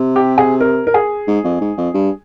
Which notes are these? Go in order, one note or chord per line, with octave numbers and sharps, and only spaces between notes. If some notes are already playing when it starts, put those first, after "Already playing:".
Already playing: C3
G4
G#4
A#4
A#4
G#4
G#2
F2
G#2
F2
G2